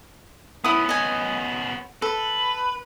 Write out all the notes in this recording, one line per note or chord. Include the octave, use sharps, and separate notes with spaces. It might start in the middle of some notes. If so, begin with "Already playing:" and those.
B3 C#4 E4 D#6
D#5 G#5
A4 B4